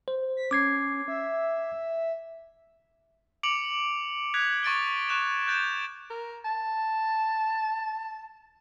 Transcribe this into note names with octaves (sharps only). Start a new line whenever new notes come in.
C5
B6
C#4 D6 G#6 C7
E5
D6 C#7 D7 F7 F#7
D#6 F#6 G#6 B6 F7
C#6 A6 D7 G7
C#6 F#6 E7 F7
F#6 G6 A6 D7 E7
A#4
A5